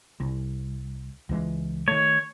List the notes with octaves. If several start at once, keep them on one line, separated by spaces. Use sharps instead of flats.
C2
C#2 E3 G#3
D#3 A3 C#5